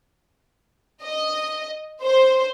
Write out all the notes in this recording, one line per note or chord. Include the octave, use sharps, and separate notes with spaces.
D#5
C5